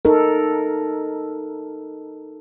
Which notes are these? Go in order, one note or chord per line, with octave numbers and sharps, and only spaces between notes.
D#4 A4 A#4